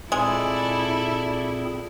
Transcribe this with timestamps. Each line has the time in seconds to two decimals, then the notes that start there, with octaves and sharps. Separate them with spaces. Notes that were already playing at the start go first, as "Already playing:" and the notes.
0.12 A#2 G#3 C4 E4 G#4 A4 D5